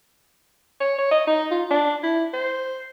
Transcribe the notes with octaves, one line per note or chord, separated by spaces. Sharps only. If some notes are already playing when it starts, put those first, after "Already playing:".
C#5
C#5
D#5
D#4
F4
D4
E4
C5